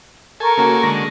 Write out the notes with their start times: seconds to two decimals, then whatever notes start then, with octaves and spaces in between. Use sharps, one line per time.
0.40 A4 A#4 G#5 C#6
0.57 C#3 A#3 F#4
0.83 D3 G#3 A#6